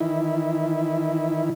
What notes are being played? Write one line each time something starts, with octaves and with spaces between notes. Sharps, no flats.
D#3 E3 E4